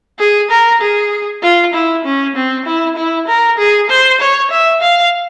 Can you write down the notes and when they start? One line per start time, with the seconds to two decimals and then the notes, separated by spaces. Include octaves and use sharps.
0.19 G#4
0.50 A#4
0.81 G#4
1.42 F4
1.73 E4
2.04 C#4
2.35 C4
2.66 E4
2.96 E4
3.27 A#4
3.58 G#4
3.89 C5
4.20 C#5
4.50 E5
4.81 F5